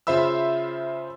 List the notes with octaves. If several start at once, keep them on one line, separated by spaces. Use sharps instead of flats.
C#3 F4 C5 E5 B5 E6